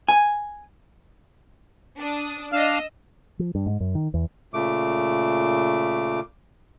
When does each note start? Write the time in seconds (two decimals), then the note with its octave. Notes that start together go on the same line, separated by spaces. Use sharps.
0.08 G#5
1.98 D4 D#6
2.52 D4 D#5 F5 E6 F6
3.39 F3
3.55 G2
3.66 G#2
3.80 F#2
3.95 D#3
4.14 E2
4.54 A#2 C#3 A3 D6